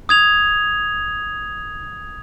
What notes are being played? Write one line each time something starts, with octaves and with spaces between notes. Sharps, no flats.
D#6 G#6 F7